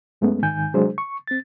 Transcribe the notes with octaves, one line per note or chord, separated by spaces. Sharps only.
F#2 G#3 A3 B3 C#4
G#2 D#3 G#5 G6
C3 F#3 G#3 D4 G#4 C5
C#6
C4 A6